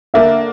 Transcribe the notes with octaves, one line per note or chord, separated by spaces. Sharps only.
D3 A#3 D4 A#4 E5